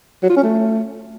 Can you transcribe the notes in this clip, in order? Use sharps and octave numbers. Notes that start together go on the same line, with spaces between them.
F#3
F4
C#4
A3